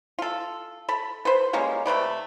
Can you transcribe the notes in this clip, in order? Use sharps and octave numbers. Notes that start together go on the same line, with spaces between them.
F4 A4
A4 B5
B4 C5
G3 G#3 A#3 C#4
C3 A3 B4 D5